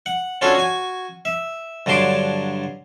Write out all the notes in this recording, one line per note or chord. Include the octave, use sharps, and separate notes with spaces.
F#5
C#4 D4 F4 F#4 A4 C#5
F#4 G#5
E5
G2 D3 F#3 A5 C6 D6